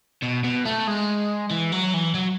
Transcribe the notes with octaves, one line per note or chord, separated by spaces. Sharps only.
B2
B2
A3
G#3
E3
F#3
E3
F#3